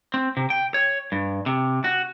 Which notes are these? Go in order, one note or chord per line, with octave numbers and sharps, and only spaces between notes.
C4
C3
G5
C#5
G2
C3
F#4